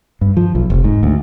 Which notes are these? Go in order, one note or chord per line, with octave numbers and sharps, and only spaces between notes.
G2
F3
B1
F1
G#2
D2